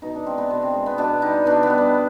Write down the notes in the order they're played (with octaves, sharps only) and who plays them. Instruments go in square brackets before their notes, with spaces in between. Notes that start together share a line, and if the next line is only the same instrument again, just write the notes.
[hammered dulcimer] B2 D#4
D4
G#3 C4
B3
B2 C4
C4
G#3
B3
B2 D4
G3 D#4
B2 D4
B3
G3
D4